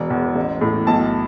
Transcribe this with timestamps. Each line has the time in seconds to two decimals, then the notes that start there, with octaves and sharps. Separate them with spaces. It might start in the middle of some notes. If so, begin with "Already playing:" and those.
Already playing: E1
0.10 E2
0.36 A1
0.61 A2
0.87 B1 A5